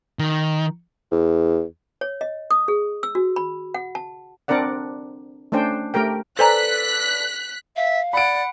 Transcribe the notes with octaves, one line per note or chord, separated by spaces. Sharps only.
D#3
E2
C#5
D#5
D#6
G#4
E6
F#4
B5
F#5
A5
C4 D4 A#4 D5 F#5
A3 C#4 D4 C5 G5
A3 G4 A#4 G5
A4 B4 C5 D5 G#5 A#5 F#6 B6
E5 F5
D5 F#5 B5 D7